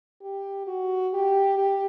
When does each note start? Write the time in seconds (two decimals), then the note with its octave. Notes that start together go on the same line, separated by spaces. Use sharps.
0.22 G4
0.67 F#4
1.13 G4
1.58 G4